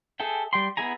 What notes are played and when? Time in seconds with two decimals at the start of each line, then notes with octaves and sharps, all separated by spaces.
0.20 G#4 A4 E5 G5
0.53 G3 G5 C6
0.77 B3 E4 G#4 G#5 A#5